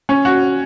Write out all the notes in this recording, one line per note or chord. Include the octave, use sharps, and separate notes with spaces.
C#4
F#4